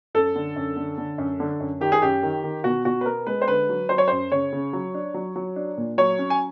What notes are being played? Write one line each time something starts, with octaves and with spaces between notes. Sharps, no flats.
F#2 A4
D3
F#2
D3
D3
F#2
D3
F#2
D#3 G4
G#4
F#2 G4
D#3
D#3
B2 F#4
B2 F#4
B4
B3 A#4
G#3 B4
C5
D3 B4
F#3
F#3 C5
C#5
F#2 C5
C#3 C#5
C#3
F#3
D4
F#3
F#3
D4
A#2
F#3 C#5
C#4
G#5